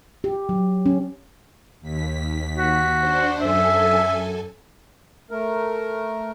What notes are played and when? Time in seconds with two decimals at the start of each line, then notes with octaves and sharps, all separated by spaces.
0.24 G4
0.49 F#3
0.86 C#4
1.81 D#2 B6
2.58 F#4
3.00 D4 C5
3.41 F#2 A4 E5 G#5
5.31 A3 A#4